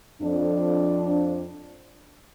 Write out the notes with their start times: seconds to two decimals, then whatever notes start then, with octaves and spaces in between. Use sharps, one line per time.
0.22 F2 D4